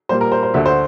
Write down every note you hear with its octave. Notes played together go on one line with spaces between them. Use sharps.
A#2 G3 A#3 C5
A#4
C5
C5
D2 D3 A3 E5
C5